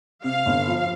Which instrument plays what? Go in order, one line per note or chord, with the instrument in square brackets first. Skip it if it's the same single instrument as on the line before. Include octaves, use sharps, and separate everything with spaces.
[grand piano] C3 [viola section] F5
[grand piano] G1
F3